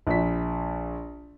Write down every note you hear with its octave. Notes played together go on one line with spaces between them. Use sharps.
A#1 B6